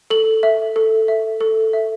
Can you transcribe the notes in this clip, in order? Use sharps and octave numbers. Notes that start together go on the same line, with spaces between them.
A4 F#7
E5
A4
E5
A4
E5